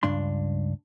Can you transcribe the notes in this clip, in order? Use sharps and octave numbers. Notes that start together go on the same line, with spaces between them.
C#2 G2 D4 C6